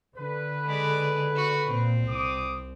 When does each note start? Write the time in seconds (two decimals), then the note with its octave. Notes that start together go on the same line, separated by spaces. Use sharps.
0.16 D3 B4
0.66 G#3 D5
1.36 F#4
1.70 A#2 C4
2.09 C2 D6 D#6